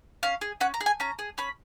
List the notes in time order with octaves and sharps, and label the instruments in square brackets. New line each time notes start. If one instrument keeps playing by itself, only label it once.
[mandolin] C#4 F5
G#4
C#4 F#5
A#5
G#4
G#5
C#4 A#5
G#4
C#4 B5